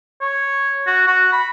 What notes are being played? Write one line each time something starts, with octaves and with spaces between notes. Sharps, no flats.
C#5
F#4
F#4
B5